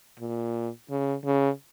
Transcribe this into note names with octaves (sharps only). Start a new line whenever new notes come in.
A#2
C#3
C#3